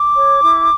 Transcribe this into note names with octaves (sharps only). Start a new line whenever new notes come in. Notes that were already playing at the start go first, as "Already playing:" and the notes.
Already playing: D6
C#5
E4